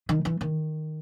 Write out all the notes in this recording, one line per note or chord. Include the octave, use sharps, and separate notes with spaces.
D#3
E3
D#3